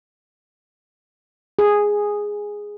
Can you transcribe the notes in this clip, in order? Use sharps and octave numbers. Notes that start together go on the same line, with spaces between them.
G#4